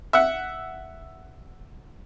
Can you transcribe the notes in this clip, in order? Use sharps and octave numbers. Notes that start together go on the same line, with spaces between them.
E5 F#5